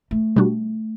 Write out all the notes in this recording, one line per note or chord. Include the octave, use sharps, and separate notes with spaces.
A3
B2 G3 D4 F#4